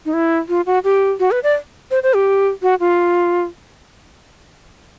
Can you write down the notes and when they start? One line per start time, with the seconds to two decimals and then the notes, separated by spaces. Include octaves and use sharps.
0.05 D#4
0.13 E4
0.49 F4
0.66 F#4
0.84 G4
1.20 F#4
1.31 B4
1.44 D5
1.91 C5
2.03 C5
2.15 G4
2.62 F#4
2.80 F4